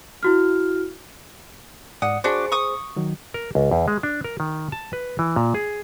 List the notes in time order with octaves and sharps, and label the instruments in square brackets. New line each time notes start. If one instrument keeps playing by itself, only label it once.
[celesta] E4 F#4 F6
[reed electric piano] G#2 D5 D#6 [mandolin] F#5
[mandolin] D4 F#4 [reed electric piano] G#4 C5
[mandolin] C#6 D#6
[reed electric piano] D#3 F#3
[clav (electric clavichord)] A#4
C#2
E2
G#3
D4
A#4
D#3
A5
B4
E3
A#2
G#4